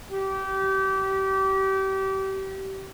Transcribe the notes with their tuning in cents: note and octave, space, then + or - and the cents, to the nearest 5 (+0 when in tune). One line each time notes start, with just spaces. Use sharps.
G4 -30